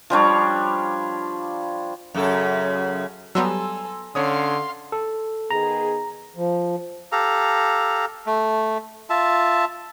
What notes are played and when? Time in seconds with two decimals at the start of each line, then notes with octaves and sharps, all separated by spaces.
0.10 F3 G3 D4 C#5
2.15 F#2 C#3 A4
3.35 F#3 G3 B3 A4 G#5 A#5 C6 E6
4.15 D3 C#4 C#5 F5 C6 D#6
4.92 A4
5.51 D#3 B3 G#4 A#5
6.36 F3
7.12 G4 A4 F5 A#5
8.26 A3
9.10 F4 E5 A5